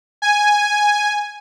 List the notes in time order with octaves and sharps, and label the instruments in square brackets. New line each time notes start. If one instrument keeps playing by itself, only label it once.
[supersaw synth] G#5